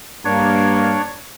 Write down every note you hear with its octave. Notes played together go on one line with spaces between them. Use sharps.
G2 A#3 D4 C#5